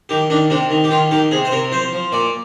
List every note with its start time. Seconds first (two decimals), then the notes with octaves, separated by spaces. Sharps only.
0.09 D#3 G4
0.30 D#3 D4
0.50 C3 D4
0.70 D#3
0.84 G4
0.91 D#3 F4
1.11 D#3 G4
1.31 C3 G#4
1.45 C5
1.52 C3 A#4
1.72 F3 C5
1.93 F3
2.12 A#2 D5